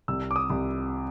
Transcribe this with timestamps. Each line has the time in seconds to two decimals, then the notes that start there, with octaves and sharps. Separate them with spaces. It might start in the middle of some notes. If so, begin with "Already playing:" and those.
0.08 C2 E6
0.31 D6
0.36 D#6
0.50 C2